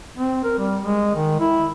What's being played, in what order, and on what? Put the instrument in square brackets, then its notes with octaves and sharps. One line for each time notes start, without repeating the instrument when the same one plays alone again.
[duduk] C4
A#4
G3
G#3
D#3
E4